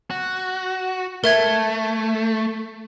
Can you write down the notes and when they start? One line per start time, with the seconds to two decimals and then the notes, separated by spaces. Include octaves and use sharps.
0.11 F#4
1.24 A3 A#4 E5 G#6